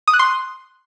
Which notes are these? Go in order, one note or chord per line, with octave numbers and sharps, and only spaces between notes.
D#6
F#6
C6